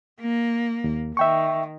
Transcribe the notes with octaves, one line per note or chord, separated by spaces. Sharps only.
A#3
D#2
D#3 E5 G5 C#6